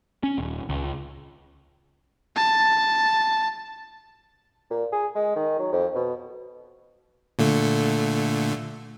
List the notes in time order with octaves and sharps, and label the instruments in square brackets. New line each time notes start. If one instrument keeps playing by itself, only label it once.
[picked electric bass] C#4
D#1
C#2
[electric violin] A5
[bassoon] A#2
G#4
G#3
D#3
F#3
F2
B2
[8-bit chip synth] A#2 D3 A3